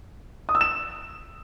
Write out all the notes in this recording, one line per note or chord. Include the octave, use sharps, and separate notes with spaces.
D#6
E6
E7